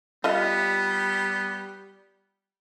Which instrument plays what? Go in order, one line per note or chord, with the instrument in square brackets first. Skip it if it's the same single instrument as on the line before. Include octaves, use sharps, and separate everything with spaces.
[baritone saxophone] G3 [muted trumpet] B3 [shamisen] F4 D#5 E5